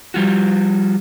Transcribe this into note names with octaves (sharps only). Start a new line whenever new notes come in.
F3 G3 F4 F#4